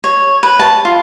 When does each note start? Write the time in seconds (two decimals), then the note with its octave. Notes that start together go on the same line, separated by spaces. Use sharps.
0.04 C#5
0.43 B4
0.59 A5
0.85 F4